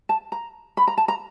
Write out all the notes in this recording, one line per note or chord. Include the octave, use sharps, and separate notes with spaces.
A5
A#5
B5
A#5
A5
A#5